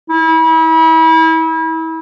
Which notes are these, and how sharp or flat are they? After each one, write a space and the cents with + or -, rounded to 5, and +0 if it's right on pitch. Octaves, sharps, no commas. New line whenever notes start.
E4 -35